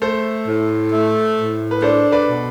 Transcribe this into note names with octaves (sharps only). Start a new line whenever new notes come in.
A3 A4 C5
A2
A3
A2
B4
D4 A4 C5
B4 D5
B2